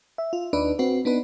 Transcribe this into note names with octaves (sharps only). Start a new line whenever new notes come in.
E5
F4
D#2 D4 D#4 B4
C4 F#4 B4
B3 D4 D#4 B4